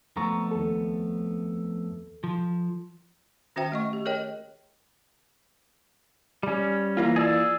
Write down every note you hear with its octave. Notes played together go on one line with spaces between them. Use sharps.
F2 A3 B3 A#5 C#6
D#2 A4
F3
D#3 C#4 F#4 C5 E5 G5
A3 D#5 C#6
G4
G#4 A#4 C#5 D#5 G5
G3 C#4
E3 A#3 F4
G#4 D5 E6